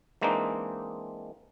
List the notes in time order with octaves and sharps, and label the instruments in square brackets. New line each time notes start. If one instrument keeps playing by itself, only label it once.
[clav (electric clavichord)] E3 G#3 A#3 C4 D4 D#4